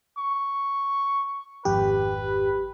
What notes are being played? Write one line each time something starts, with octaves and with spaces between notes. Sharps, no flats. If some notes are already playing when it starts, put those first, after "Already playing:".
C#6
G#1 F2 G4 B4